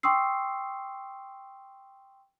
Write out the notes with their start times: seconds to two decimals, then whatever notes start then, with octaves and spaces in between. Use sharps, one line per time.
0.03 G5 C6 C#6 D#6 E6 C7